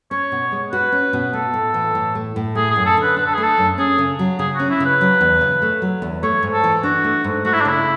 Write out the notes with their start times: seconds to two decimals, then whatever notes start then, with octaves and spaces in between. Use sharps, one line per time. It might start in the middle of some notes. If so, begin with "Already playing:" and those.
0.11 C#4 C#5
0.32 B2
0.52 G#3
0.72 F#4 B4
0.92 C#4
1.13 B2
1.33 A3 A4
1.54 A2
1.74 E3
1.95 A2
2.15 A3
2.36 A2
2.55 A3 G#4
2.70 G#4
2.76 F#2
2.86 A4
2.97 D3
3.02 B4
3.17 D4 B4
3.26 A4
3.34 G#4
3.38 A3
3.43 A4
3.58 F#2
3.78 C#4 G#4
3.98 C#3
4.19 F#3
4.39 C#3 G#4
4.55 C#4 F#4
4.70 E4
4.80 C#3
4.85 B4
5.01 F#3
5.21 E2
5.41 C#3
5.62 A3
5.82 F#3
6.02 E2
6.23 A3 C#5
6.43 G#2
6.53 A4
6.64 E3
6.83 D4 F#4
7.04 A3
7.24 G#2
7.45 A3 F#4
7.53 E4
7.61 D4
7.65 C#3 E4